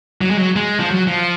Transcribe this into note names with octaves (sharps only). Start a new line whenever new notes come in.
F#3
G#3
F#3
G#3
F3
F#3
F3